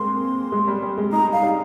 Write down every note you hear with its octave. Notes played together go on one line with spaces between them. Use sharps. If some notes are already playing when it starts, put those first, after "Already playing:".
Already playing: G#3 A#3 C4 C6
G#3
G3
G3
G#3
D#4 A#5
G3 F5
G3